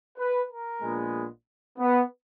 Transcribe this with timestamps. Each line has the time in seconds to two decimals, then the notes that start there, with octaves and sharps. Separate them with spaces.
0.18 B4
0.49 A#4
0.82 A#1 A#2 G#3 B3
1.79 B3